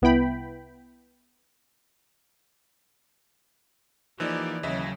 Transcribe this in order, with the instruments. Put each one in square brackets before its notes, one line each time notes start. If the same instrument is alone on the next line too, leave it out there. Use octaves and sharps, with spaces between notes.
[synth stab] C2 B3 E4 G5 B5
[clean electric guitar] E3 [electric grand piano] F3 A#3 D#4 [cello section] G4 D5
[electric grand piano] D#2 D#5 E5 [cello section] C#3 F#3